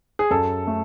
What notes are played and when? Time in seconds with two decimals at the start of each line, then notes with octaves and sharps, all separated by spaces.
0.19 G#4
0.31 F#2 A4
0.67 A3